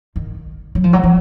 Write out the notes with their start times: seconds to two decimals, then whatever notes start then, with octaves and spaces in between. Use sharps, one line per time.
0.16 D#3
0.75 F#3
0.84 F3
0.93 F#3
1.04 F3